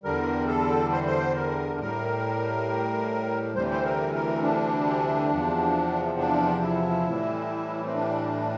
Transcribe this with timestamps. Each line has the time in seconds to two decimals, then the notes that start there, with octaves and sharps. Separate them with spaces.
0.04 E2 D3 G3 A#4
0.48 A4
0.93 C5
1.06 C5
1.36 A#4
1.79 A2 G3 A#4
3.55 D2 C3 E3 G3 C5
3.71 C5
3.85 A#4
4.15 A#4
4.43 D4
5.31 E2 C3 F3
6.19 D4
6.62 E4
7.07 A2 E3 G3
7.86 C4
7.95 D4